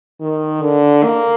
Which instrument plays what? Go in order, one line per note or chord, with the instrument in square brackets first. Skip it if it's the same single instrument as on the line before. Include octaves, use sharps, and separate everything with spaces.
[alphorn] D#3
D3
A#3